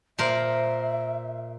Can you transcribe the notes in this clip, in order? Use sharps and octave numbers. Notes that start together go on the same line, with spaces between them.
A#2 A#4 C5 E5